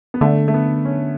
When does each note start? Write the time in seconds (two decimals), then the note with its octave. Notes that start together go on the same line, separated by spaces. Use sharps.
0.14 B3
0.21 D3 A3
0.48 A3
0.54 B3
0.85 C#4